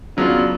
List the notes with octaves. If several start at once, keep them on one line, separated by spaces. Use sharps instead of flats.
C#3 F#3 B3 D4 F4